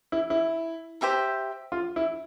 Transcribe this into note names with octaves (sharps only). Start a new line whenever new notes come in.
E4
E4
G4 C5 E5 A#5
F4
E4